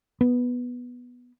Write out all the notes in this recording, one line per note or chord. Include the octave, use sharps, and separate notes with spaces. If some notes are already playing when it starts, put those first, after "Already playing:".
B3